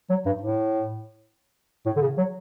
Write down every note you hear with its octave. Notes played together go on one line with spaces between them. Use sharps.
F#3
G2
A2
A2
D3
C#3
F#3